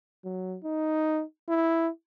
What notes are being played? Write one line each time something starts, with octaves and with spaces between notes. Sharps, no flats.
F#3
D#4
E4